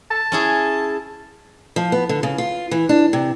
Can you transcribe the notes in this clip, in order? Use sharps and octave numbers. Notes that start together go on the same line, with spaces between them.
A5
C#4 E4 G#4
F3
B3
D3
C#3
F4
E3
D4
C3